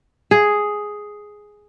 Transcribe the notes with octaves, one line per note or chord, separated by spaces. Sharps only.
G#4